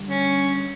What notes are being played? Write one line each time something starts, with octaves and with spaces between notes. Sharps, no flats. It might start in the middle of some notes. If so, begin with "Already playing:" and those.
Already playing: D3 G3
C#4